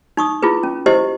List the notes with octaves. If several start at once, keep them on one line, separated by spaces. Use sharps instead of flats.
D#4 C#6 D#6
E4 F4 G#4 B4
C#4
E4 G4 C5 D#5